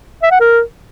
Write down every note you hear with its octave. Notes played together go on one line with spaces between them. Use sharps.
E5
F#5
A#4